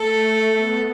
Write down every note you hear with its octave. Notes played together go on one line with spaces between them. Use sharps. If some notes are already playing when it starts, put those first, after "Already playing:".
Already playing: A3 A4
A3
B3